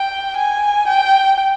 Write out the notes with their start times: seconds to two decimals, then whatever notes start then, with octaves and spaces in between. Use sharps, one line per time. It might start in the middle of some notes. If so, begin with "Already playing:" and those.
Already playing: G5
0.37 G#5
0.88 G5